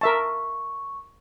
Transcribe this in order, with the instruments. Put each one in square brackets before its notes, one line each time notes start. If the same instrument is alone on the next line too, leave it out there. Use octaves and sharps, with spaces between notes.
[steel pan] A#4 E5 A5 [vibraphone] C#6